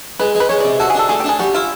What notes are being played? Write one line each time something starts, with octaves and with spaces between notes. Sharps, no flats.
G#3 B4
G#3
B4
G#3 C#5
C3 D5
F#4 A4
G#4
D4 A4
A3 G#4
G4
D4 G#4
G3 F#4
E4 F4